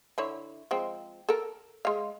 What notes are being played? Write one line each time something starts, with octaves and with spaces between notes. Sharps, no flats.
D3 E4 C#5
F3 G#3 C4
A4 A#4
G#3 F5